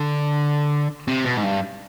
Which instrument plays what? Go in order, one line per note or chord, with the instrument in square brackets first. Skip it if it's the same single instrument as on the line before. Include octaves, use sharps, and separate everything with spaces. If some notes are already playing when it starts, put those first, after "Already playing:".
Already playing: [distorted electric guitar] D3
C3
B2
G#2
G2